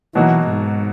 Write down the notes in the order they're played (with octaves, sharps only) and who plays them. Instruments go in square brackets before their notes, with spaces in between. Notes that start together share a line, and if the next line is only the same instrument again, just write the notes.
[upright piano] B2 F#3 A#3 D#4 F#4 [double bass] E3
[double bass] G#2